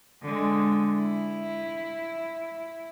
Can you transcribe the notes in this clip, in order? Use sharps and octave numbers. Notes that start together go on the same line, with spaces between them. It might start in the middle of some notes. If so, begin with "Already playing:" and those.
D3 G#3
E4